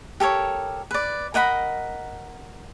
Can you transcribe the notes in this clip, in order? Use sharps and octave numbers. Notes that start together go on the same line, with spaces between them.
G4 A4 A#4 C#5
B4 D5
A#4 D#5 F#5 B5